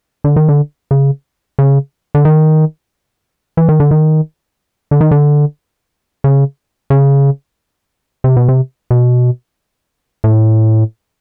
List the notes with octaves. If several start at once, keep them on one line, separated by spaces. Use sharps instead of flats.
D3
D#3
D3
C#3
C#3
D3
D#3
E3
D#3
D3
D#3
D3
D#3
D3
C#3
C#3
C3
B2
C3
B2
A2